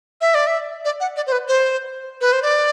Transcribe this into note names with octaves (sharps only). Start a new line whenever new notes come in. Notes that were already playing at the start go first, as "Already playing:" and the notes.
E5
D5
E5
D5
F#5
D5
C5
B4
C5
B4
C5
D5